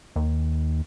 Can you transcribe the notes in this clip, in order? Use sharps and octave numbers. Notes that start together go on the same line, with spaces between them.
D#2